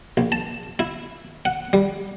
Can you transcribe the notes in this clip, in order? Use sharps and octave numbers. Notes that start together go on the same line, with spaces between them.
A#1
A5
E4
F#5
G3